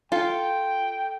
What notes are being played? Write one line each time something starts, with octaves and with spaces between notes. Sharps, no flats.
F4 A4 G5